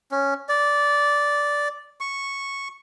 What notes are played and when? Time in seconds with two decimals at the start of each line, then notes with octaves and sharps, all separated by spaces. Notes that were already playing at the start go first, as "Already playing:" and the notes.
0.12 C#4
0.49 D5
2.00 C#6